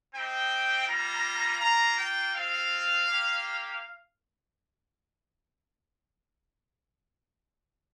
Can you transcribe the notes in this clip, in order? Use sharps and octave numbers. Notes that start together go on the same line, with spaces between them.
C4 D#4 G4 G5
G3 A#3 F4 A#5
A#3 F4 A#5
G5
C4 F4 F5
A#3 G4